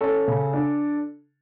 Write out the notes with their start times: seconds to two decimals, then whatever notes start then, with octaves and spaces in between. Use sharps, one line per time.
0.01 C#4 A4
0.28 C#3
0.53 D4